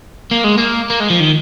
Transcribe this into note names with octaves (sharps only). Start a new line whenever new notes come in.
A#3
G#3
A#3
A#3
G#3
F3
D#3